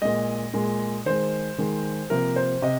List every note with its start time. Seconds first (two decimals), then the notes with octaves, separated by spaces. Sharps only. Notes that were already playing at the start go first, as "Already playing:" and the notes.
0.02 A#2 G#3 D#5
0.54 A#2 G#3
1.06 D#3 G#3 C5
1.58 D#3 G#3
2.10 C3 F3 A#3 A#4
2.36 C5
2.62 C3 D#5